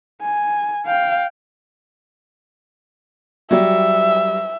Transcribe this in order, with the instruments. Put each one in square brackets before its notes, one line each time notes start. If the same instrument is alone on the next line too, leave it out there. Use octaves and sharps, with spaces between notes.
[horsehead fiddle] G#5
F5 G5
[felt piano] F#3 G3 [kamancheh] E5